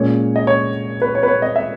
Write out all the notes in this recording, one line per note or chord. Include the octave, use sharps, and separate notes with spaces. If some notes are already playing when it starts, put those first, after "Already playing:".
Already playing: A#2 G#3 C#4 C#5
D#5
C#5
B4
C#5
B4
C#5
D#5
E5